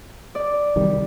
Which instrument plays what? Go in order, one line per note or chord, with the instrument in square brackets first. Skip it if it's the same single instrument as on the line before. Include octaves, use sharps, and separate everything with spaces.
[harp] D5
[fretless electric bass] C2 D#3 G3